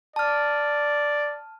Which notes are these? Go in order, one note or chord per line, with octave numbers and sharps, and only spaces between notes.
D5 A5 F6